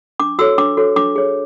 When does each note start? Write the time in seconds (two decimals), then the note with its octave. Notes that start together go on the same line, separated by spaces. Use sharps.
0.20 D4 D6
0.39 F#4 A4 C#5 E6
0.58 D4 D6
0.77 F#4 A4 C#5
0.96 D4 D6
1.16 G#4 C#5